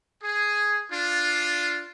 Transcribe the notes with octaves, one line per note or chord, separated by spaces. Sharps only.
G#4
D4 F4